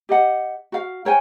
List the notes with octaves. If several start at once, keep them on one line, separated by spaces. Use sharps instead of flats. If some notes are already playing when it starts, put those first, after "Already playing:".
G4 D#5 F#5
F#4 F5
A#4 C#5 G5 G#5